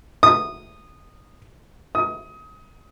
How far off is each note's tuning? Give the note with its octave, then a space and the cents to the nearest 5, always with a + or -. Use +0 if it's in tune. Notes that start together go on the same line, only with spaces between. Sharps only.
D#6 -15
D#6 +25